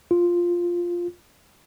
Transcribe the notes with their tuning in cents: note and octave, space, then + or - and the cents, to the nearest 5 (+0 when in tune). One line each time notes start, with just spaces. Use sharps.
F4 +0